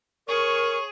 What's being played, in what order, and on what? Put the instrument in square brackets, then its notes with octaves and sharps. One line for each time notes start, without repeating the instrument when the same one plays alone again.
[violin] G#4 [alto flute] A#4 [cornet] C#5 [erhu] C#6